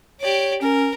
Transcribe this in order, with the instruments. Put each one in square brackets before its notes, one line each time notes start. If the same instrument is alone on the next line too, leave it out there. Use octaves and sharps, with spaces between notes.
[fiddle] G4 D5 [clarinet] C#5
[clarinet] C#4 [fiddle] A#4